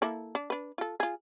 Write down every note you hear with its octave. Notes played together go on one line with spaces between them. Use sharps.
A#3 E4 A4
D4
D4 B4
F4 A4
F4 G#4